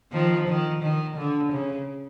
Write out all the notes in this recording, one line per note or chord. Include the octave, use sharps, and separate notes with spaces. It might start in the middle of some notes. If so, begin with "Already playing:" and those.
D#3 F3
D#3
D#3
D3
C#3